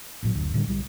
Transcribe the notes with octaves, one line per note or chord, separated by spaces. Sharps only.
A1 A#2 F#3
F#1 D2
A2 D3 F#3 G3
B1 G3